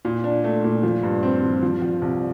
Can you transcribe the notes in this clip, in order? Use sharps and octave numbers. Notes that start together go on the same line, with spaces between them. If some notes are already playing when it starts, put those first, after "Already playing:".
A#2
D4
A3
A#2
F3
G2
C4
F3
F3
F3
C2